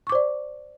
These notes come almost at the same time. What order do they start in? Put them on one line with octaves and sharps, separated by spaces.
C#6 D6 C5 D5